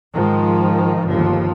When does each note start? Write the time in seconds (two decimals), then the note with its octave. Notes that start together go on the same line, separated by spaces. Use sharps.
0.14 G#2 D#3 F3 G#3
1.06 G1 D#2 F3